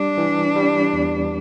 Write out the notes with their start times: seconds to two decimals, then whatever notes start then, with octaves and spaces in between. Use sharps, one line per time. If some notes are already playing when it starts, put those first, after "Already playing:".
Already playing: G3 D4
0.18 E3
0.56 G3
0.93 E2